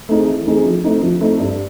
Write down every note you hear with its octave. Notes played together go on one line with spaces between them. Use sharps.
A3 C4 D#4 G#4
E3
A3 C4 D#4 G#4
F3
A3 C4 D#4
F3
A3 C4 D#4
G2